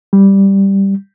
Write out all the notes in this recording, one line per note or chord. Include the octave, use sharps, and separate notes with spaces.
G3